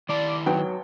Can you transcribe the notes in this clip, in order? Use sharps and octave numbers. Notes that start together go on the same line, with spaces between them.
D#3 E4 D5 A5
G#1 F#3 B3 G5